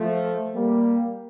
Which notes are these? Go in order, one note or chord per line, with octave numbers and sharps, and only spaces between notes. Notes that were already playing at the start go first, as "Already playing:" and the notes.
Already playing: F3 A3
G3 A#3